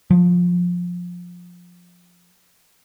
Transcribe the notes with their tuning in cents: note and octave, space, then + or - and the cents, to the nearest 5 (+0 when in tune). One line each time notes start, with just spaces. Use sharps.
F3 +20